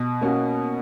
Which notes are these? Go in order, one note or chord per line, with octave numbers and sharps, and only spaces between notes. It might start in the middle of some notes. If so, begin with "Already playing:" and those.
Already playing: B2
A#3 C#4 F#4